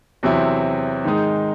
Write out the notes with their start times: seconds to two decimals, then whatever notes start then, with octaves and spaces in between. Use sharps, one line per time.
0.23 E2 C3 F#3 C4 E4
1.04 G#2 D#3 G#3 D#4